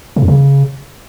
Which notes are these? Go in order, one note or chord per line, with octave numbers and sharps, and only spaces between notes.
C#3
F2
C#3